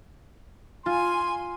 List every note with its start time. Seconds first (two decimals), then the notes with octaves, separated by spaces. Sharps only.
0.86 F4 G#5 C6